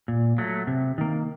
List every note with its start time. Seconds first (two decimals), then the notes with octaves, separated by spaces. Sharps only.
0.08 A#2
0.38 F#3 A3
0.67 C3
0.98 D#3 A#3